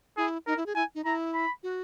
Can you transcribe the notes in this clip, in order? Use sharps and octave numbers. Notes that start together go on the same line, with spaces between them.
E4 G#4
D#4 A#4
E4
G#4
E4 G#5
D#4
E4 A#5
B5
F#4